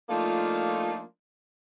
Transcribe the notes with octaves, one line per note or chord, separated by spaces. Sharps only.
F3 A3 A#3 D4 D#4 F4